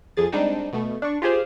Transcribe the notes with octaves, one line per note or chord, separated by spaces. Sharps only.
F2 G#4 A6
G3 G#3 C4 D4 D#4
B2 A3
D4 C#6
F4 G4 G#4 C5